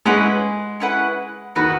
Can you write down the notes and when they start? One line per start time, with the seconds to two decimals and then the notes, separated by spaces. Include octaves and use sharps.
0.05 G#3 C#4 E4 B4 F#5
0.80 C#4 E4 B4 F#5
1.55 D#3 B3 F#4 B4 F#5